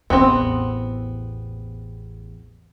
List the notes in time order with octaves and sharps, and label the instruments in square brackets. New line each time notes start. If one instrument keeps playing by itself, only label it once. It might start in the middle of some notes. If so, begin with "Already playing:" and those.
[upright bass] A1 E2 [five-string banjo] B3 C4